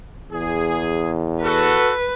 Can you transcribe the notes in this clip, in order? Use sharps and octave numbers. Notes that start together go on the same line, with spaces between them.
E2 G#4
F#4 A4 B4